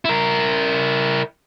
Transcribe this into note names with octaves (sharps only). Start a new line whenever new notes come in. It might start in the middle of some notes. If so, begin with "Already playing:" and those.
E4 A#4